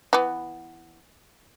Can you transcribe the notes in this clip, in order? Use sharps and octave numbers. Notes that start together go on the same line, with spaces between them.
E3 B3